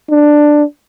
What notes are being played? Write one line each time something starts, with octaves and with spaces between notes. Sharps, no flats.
D4